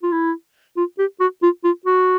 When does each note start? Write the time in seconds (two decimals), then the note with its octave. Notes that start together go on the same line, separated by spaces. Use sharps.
0.03 F4
0.12 E4
0.77 F4
0.99 G4
1.20 F#4
1.42 F4
1.64 F4
1.85 F#4